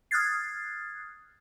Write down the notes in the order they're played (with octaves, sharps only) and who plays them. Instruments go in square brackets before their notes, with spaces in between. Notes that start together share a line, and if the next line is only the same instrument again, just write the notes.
[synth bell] D#6 F6 F#6 G#6 A6 C7